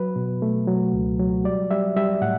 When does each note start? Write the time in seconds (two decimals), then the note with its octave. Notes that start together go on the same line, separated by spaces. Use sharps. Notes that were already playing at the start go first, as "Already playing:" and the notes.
Already playing: F#3 B4
0.16 B2
0.42 A3
0.67 F#3
0.93 C#2
1.19 F#3
1.44 G3 D5
1.71 G3 E5
1.96 G3 E5
2.22 A2 F#5